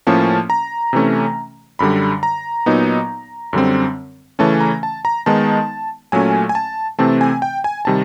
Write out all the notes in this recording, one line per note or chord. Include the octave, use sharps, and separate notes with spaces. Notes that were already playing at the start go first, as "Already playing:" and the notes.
A2 F3 A#3 C#4 A5
A#5
C3 E3 A3 C#4
F#2 D3 G3 B5
A#5
A#2 F#3 B3 D#4
F#2 D3 G3 C4
C#3 E3 A3 C#4 A5
A#5
A5
A#5
D#3 G#3 B3 D#4 A5
A#2 F#3 A3 C#4 G#5
G#5
A5
C3 E3 A3 C4 A5
G#5
G5
G#5
C3 D#3 G3 A5